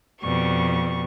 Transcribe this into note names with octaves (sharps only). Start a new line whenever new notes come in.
F2 B2 G3 C#6